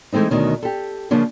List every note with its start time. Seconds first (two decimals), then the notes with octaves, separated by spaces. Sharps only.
0.12 E3 G#3 A3 C4 D#4
0.30 D2 B2 D#3 C#4
0.63 G4 A4
1.11 C#3 F3 A#3 C#4 D4